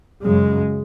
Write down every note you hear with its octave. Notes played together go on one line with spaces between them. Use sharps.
F#2 C#3 G#3